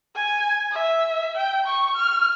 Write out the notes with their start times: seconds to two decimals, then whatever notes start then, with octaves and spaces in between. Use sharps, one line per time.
0.16 G#5
0.72 E5
1.37 G5
1.66 C#6
1.96 F6